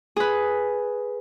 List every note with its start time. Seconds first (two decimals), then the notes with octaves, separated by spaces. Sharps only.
0.16 G#4 B4